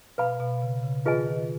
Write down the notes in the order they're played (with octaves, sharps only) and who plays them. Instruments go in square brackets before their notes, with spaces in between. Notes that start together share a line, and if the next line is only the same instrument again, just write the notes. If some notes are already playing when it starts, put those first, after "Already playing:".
[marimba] B2 [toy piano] B4 F5 B5
[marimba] B2
C#3
C#3
[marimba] D#3 [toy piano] F4 G#4 B4 D#5 G#5
[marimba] D#3